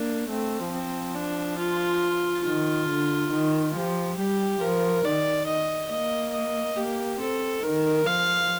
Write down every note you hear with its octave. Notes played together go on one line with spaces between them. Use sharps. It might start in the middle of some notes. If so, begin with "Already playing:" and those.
Already playing: A#3 D4
A3 C4
F3 C4
D4
F4
D#3 F4
D3
D#3
F3 G4
G3 G4
F3 A#4
D#3 D5
D#5
A#3 D#5
D#5
A#3 G4
C4 A4
D#3 A#4
F3 F5